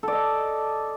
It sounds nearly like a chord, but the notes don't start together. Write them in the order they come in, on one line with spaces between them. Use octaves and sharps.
A4 D5 D#5